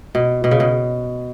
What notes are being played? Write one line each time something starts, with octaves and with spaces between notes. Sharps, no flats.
B2
B2
C#3
B2